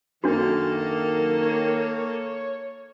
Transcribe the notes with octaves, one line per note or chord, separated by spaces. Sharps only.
F#2 D#3 A#3 D4 F#4 A4
C#5